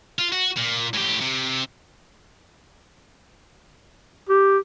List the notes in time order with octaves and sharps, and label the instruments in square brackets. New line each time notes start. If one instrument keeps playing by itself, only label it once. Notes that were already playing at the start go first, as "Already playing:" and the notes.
[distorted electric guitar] F4
F#4
A#2
A2 G4
C3
[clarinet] G4